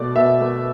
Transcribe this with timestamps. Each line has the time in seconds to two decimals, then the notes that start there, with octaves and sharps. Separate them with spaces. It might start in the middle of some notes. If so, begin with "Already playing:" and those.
Already playing: B2 A3 D5
0.15 B2 E5
0.41 A3